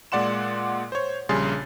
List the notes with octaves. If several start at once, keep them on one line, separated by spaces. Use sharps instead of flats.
A#2 G#3 D5 F#5 C6 E7
C5 C#5
A#1 C#3 G3 G#4 C6 A6